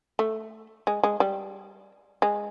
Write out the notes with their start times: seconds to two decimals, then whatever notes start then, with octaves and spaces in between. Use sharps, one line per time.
0.19 A3
0.87 G#3
1.03 G#3
1.20 G3
2.22 G#3